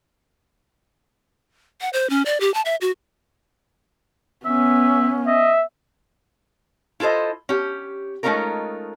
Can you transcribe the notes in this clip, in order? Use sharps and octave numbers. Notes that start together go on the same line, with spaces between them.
F#5
C5
C#4
D5
G4
A5
E5
F#4
B3 C#4 E5
D#5 E5
E4 F4 A4 C5 D#5
C#4 G4
G#3 A3 C#4 D#4 F4 A#4